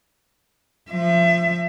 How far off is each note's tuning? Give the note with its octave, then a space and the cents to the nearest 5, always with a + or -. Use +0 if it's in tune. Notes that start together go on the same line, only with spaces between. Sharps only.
F3 +0 E5 +30